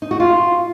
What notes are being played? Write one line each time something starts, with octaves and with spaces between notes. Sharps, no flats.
D#4
F#4
F4